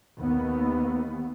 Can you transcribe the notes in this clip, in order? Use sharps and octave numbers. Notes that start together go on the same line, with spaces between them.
D#2 B3